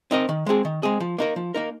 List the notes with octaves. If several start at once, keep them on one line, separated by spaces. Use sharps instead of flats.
C4 D#4 A#4 D#5
D#3
G#3 C4 G#4
D#3
G#3 C4 G#4
F3
A#3 D#4 A#4
F3
A#3 D#4 A#4